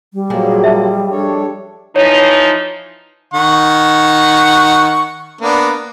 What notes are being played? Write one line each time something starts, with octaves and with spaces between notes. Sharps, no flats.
G3
A#2 F3 F#3 G#3 A#3 G#4
E5 A5
D4 A4 C#5
E3 F3 D#4 C#5
D#3 F#5 C#6
A#3 B3 D4